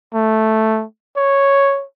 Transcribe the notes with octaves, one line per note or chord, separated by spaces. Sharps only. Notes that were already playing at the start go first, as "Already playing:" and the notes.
A3
C#5